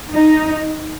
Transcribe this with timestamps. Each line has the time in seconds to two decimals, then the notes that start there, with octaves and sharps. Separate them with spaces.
0.13 D#4